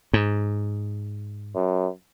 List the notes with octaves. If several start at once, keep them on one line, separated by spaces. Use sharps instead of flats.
G#2
F#2